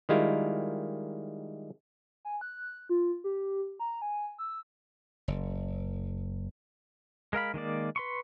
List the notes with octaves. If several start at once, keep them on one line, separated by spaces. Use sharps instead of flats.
D#3 G3 G#3 E4 F4 A#4
G#5
F#6
F4
G4
A#5
G#5
E6
F#1
G#3 A#4 F5 B5
D#3 G#3 A#3 D5
B4 C6 C#6